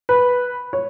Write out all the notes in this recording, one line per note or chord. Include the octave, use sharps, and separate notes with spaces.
B4
C#5